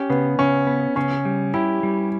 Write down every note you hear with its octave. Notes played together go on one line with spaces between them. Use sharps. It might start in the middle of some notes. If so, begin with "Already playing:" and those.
Already playing: C#4 G4
C#3 B3
C#3 C#4
B3
C#3 C#4
G3
E4 G4
G3